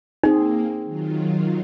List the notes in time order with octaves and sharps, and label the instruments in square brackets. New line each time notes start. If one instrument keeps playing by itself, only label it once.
[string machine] A#3 [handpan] C4 G#4 [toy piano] D#4
[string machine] D#3 F#3 F4